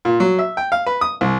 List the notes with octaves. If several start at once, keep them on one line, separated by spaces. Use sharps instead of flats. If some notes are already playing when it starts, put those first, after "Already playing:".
A#2
F#3
E5
G5
F5
B4
D#6
C2